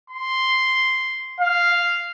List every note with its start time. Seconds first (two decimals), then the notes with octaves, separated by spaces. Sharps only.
0.10 C6
1.40 F5